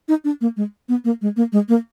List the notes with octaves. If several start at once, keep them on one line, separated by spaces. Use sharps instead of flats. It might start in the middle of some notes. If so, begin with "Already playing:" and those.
D#4
D4
A#3
G#3
B3
A#3
G#3
A#3
G#3
A#3